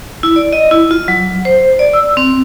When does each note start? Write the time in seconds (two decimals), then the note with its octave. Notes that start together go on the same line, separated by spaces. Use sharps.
0.23 E4
0.36 D5
0.53 D#5
0.71 E4
0.91 F4
1.08 F#3
1.45 C5
1.79 D5
1.93 E6
2.17 C4